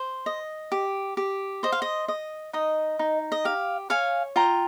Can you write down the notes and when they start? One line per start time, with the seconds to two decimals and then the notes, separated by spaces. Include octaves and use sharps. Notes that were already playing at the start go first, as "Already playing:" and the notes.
Already playing: C5
0.26 D#5
0.72 G4
1.17 G4
1.63 C5 D#5
1.72 F5
1.82 D#5
2.08 D#5
2.53 D#4 D#5
2.99 D#4
3.32 D#5
3.45 G4 F5
3.90 C#5 F5 G#5
4.36 F4 G5 A#5